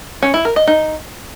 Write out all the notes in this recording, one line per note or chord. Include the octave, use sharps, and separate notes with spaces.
C#4
E4
A#4
D#5
D#4